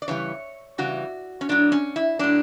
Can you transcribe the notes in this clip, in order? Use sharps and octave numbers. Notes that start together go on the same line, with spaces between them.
D5
C#3 E3 G3 C#5
C#3 E3 G3 F#4
C#4
A2 F#3 D4
C#4
E4
A2 F#3 D4